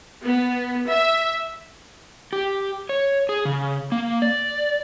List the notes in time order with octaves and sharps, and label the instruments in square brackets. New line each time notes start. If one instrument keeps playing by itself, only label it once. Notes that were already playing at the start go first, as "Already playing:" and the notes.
[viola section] B3
E5
[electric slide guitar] G4
C#5
G#4
C#3
A#3
D5